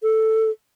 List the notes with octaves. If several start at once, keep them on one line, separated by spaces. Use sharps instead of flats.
A4